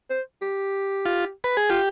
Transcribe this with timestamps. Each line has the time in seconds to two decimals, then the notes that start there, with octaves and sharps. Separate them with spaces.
0.10 C5
0.42 G4
1.05 F4
1.44 B4
1.57 G#4
1.70 F4 G4